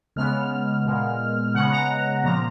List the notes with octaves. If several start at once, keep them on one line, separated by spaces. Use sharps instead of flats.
C#3 G#3 B3 F6
A#2 G#3 B3
C#3 G#3 B3 F#5
A#5
A#2 F3 A#3 A#5